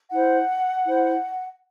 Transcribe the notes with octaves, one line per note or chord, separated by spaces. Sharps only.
E4 C5 F#5
E4 C5